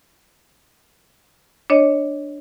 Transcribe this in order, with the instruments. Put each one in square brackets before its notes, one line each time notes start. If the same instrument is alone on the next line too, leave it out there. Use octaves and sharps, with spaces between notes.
[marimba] D4 C#5 D#5